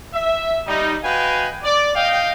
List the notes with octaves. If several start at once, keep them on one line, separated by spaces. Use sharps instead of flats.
E5
G3 D#4
F#4 B4 D#5 F5 G5 G#5
D5
D#5 F5 G5